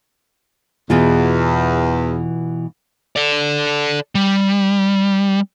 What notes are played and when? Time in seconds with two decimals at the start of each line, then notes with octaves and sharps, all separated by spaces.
0.90 E2 B2 E3 F4
3.16 A4 D5
4.15 G3